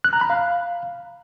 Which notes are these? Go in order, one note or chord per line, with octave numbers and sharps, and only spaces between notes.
F#6
A#5
B5
F5